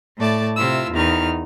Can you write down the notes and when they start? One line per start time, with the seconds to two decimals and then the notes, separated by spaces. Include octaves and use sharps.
0.18 A2 A3 D5 A5
0.56 C3 E4 F4 E6
0.93 E2 D#3 D#4 F6